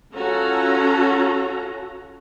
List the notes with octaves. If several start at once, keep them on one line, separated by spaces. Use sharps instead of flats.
C#4 F4 F#4 A4 A#5